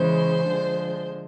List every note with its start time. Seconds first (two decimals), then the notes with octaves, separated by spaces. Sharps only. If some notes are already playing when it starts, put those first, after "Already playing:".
Already playing: C#3 E3 G#3 C5
0.46 D3 F3 G#3